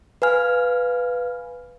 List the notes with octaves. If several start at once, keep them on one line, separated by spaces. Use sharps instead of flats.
B4 F5 G#5 F6